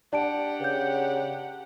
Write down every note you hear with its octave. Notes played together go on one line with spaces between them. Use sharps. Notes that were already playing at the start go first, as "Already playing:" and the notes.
D4 G4 D5 F#5 A5 D7
C#3 B4 G6